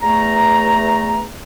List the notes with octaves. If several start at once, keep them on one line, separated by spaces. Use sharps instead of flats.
E2 A3 A#5